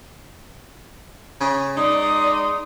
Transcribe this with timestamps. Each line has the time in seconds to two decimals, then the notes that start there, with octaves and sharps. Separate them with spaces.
1.40 C#3
1.77 G#3 D#4 D5 C6 D#6